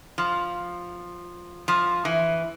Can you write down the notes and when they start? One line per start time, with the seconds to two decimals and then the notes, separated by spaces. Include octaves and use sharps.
0.18 F3
1.68 F3
2.05 E3